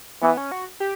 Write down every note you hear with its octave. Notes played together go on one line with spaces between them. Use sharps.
E3 B3
C#4
F#4
G4